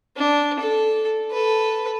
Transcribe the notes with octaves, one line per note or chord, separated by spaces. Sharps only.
D4
A4
A4 B4